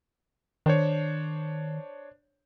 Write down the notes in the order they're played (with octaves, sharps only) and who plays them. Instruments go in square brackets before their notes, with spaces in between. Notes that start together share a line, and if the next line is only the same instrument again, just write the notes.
[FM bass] D#3 [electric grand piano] D4 C5 C#5